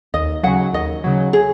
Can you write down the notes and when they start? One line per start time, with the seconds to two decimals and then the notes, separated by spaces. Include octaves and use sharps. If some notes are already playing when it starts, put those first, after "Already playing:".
0.14 D#2 D#5
0.43 C#3 F#3 F#5
0.73 D#2 D#5
1.04 C#3 F#3
1.33 G#4